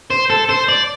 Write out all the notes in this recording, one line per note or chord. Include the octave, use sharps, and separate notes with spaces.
C5
A4
C5
D5